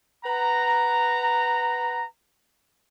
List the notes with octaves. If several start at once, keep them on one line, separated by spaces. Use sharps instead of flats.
B4 F#5 A#5